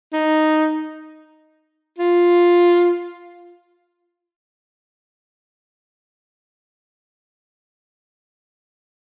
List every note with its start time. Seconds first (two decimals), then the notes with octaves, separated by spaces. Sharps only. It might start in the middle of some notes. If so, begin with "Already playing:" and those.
0.13 D#4
1.98 F4